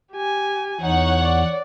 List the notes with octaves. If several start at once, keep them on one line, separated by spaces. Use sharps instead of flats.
G4 G#5
E2 D#4 C#5 F#5
D5